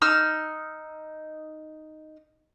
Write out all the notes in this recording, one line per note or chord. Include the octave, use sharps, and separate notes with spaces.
D#4 E6 F6